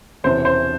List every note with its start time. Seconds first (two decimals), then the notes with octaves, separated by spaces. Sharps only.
0.24 E1 E2 C3 E3 C5
0.45 C5